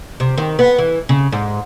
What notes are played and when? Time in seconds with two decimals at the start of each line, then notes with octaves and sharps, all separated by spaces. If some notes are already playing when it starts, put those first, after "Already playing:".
0.20 C3
0.38 D#3
0.59 B3
0.78 E3
1.09 C#3
1.32 G#2